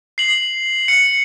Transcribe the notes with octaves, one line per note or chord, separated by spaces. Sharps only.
C7 F#7
C#7